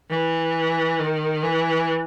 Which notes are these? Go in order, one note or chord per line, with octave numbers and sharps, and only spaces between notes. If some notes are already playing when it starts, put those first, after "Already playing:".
E3
D#3
E3